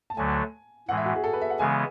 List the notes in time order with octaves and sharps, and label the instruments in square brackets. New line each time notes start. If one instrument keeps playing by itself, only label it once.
[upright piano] A5
[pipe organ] D2 D3 F#3 A3 [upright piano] G#5
[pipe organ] A2 E3 G#3 [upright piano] F#5
[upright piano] E5
F#4
G#4
A4
B4
E5
F#5
[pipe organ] C#3 E3 G#3 B3 [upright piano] G#5